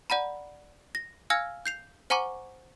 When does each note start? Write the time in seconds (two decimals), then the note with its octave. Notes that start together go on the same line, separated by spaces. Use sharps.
0.10 D5 F#5 A#5 B5
0.95 A#6
1.30 F5 G#5 E6 F6 G#6 A#6
1.66 G6 C7 F7
2.10 C5 F#5 G#5 A#5 C#6 D6